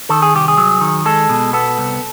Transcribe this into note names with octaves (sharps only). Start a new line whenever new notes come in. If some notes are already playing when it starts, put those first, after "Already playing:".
D#3 A4
G#4
C2 G4
G#4
F#3
D#3
G#3 A4
B2
B3 A4
C2